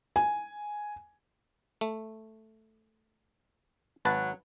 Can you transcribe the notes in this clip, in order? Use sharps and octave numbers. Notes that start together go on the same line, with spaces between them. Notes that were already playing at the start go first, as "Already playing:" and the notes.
G#5
A3
G#1 F#3 B4 A5